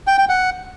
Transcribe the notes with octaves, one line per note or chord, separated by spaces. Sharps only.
G5
G5
F#5